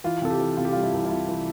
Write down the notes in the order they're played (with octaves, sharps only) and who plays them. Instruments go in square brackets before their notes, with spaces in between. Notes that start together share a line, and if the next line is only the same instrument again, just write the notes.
[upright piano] E3 F4
C3 A4
G4
E3
C3 F4
G4
G3 F4
E4
C2
E4
C3 F4
E3